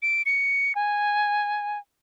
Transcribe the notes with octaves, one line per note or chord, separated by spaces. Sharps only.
D7
C#7
G#5